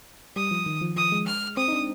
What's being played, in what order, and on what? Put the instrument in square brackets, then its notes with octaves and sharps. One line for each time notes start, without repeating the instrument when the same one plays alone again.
[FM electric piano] G3 [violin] D#6
[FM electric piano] F3
D#3
F3
[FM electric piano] F3 [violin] D#6
[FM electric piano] G#3
[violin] F6
[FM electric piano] C4 [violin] D#6
[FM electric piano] D#4
D4